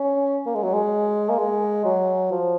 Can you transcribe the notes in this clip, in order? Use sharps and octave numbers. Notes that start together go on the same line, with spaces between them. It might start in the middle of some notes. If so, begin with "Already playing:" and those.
Already playing: C#4
A#3
G#3
F#3
G#3
A#3
G#3
F#3
F3